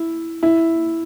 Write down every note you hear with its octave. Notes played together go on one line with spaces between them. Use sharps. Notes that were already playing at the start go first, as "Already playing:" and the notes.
Already playing: E4
E4